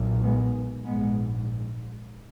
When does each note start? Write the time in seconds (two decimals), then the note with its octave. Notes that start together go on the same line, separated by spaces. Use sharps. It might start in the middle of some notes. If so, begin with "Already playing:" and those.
Already playing: B1 A#2
0.22 G#3 B3
0.83 A#1 G#2 G#3 B3